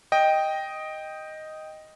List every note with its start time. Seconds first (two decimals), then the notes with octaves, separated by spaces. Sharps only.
0.12 D#5 G5